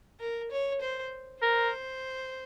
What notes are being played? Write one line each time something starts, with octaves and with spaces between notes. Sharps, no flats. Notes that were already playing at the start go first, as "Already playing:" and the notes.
A#4
C#5
C5
A#4 C5